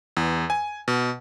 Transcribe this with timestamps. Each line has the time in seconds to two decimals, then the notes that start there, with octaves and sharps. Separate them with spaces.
0.17 E2
0.50 G#5
0.88 B2